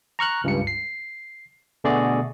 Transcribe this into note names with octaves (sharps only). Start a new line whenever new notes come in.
A#5 C#6 F6 F#6
C#2 G2 C#7
C7
B2 D3 A3 F#4 G#4 D5